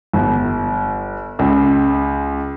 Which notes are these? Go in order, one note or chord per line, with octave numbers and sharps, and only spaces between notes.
G1
C#2